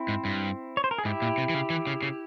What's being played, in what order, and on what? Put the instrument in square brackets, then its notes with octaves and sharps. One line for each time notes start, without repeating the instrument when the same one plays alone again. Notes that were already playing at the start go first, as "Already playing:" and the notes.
Already playing: [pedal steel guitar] C4 E4
[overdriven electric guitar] G#2
G2
[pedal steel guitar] C#5
C5
A#4
G#4
[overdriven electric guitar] G#2 [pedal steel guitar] E4 G4
[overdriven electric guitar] A#2
C3
E3
C#3
E3
C#3
C#3